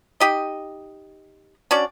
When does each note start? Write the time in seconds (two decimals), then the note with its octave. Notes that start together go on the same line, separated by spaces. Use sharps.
0.20 D#4 G4 D#5
1.71 C#4 D4 F#4 D5